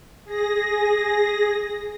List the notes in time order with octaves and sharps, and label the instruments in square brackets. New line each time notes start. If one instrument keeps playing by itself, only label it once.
[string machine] G#4 A#6